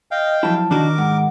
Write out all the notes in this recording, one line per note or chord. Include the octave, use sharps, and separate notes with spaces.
D#5 F5 G5
F3 F#3 E4 A5
D#3 D4 D#4 F#4 A#4 D6
G#2 F#5